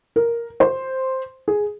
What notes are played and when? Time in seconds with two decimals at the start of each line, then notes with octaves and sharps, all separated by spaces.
0.16 A#4
0.60 C5
1.48 G#4